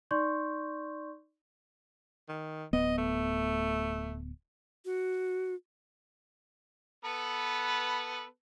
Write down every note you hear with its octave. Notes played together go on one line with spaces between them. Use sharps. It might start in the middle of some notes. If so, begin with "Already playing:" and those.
D#4 D5 C6 C#6 G6
D#3
D1 B3 D#5
A3
F#4
B3 A4 B4